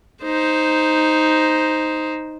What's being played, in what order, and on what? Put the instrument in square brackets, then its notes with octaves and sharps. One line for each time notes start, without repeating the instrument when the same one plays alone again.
[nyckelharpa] D#4 C5